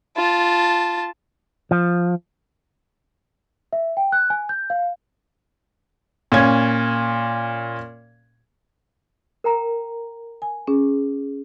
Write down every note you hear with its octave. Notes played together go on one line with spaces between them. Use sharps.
F4 A5
F3
E5
G5
F#6
G#5
G6
F5
A#2 C#4 G#6
A#4 G5 A#5
G#5
C#4 G#4